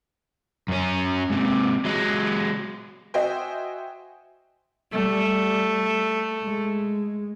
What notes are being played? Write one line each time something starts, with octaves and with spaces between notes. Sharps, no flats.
F#2 C#4
G#2 C3
F#3 G#3
F#4 C5 D#5 E5 G5 G#5
G3 A3
G#3